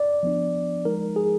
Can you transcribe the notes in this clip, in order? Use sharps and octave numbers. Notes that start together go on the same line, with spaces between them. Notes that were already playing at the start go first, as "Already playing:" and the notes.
Already playing: D5
F3 B3 D4
F3 G#3 D#4 A#4
G#4